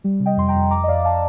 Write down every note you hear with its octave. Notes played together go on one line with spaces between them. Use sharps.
G3
C3
D#5 G5
F2 C6
G5 A#5
F2
F2 A#5 D6
D#5
F2 D5 F5
F5 A5